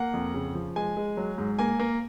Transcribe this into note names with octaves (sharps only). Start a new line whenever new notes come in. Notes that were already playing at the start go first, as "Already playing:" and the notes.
Already playing: A#3 F#5
F2
C#3
F3
G#3 G#5
G#3
F#3
G#2
A#3 G#5
A#3